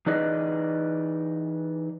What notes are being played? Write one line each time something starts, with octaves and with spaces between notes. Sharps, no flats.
E3 D#4 G#4 B4 D5 D#5